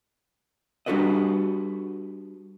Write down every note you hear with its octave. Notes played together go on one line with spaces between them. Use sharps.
G3 D4 F#4 A4 B4 D#5